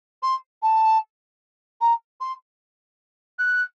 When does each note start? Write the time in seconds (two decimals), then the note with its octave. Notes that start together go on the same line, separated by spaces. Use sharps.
0.23 C6
0.62 A5
1.81 A#5
2.21 C6
3.39 F#6